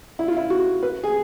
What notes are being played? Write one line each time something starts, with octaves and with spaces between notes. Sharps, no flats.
E4
F4
E4
F#4
B4
G#4